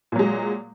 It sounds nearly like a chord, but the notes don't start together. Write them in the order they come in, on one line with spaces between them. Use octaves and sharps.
A#2 F#3 G#3